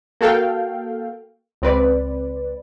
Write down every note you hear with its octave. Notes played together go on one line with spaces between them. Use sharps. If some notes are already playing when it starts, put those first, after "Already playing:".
A#3 F#4 A4 F5 G5
C#2 C4 B4 D5